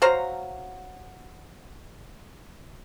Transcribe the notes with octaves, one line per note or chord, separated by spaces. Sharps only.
F#3 C5 F5 A#5